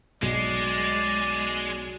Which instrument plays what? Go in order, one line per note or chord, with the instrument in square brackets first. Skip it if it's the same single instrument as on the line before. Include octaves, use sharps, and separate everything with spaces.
[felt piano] B1 [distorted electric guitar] G#3 [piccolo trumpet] D5